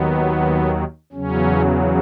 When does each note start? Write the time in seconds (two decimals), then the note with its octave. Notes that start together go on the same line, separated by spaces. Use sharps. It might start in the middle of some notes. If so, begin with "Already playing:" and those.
Already playing: D#2 D#3 F#3 B3
1.12 E2 C#3 F#3 C#4